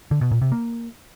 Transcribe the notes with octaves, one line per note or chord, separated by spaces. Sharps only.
D3
B2
A#2
C3
A#3